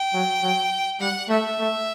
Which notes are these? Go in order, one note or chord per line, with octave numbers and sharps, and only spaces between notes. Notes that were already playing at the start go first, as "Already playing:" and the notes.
Already playing: G5
F#3
F#3
G3 F#5
A3 E5
A3